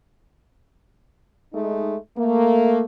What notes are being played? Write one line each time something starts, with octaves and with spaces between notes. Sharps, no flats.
G#3 A3 D#4
A3 A#3